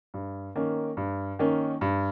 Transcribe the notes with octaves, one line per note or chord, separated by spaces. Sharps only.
G2
D#3 A#3 C#4
G2
D#3 A#3 C#4
G2